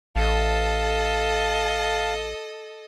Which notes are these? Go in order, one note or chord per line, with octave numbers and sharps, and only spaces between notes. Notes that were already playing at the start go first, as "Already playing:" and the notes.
A1 A4 D#5 F5 A5